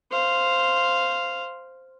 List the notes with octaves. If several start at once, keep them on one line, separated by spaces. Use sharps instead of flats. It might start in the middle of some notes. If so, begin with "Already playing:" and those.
C5 F5